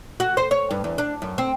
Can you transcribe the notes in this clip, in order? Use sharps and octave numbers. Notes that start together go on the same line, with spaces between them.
F#4
C5
C#5
G2
E2
D4
F#2
C4